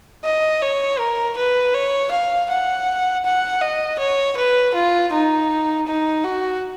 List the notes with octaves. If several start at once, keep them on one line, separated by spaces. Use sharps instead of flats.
D#5
C#5
A#4
B4
C#5
F5
F#5
F#5
D#5
C#5
B4
F4
D#4
D#4
F#4